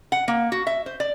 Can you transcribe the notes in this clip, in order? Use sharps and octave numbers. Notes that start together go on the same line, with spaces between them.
F#5
A#3
F#4
E5
C5
D5